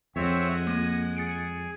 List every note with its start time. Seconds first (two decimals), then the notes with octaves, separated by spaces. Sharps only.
0.16 F2 G#3 C4 C#5 E5 F#5
0.67 A#3 A#6 D#7
1.17 G#4 A6 C#7 D7